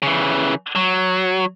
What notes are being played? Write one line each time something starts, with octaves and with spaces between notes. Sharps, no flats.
C#3 E3
F#3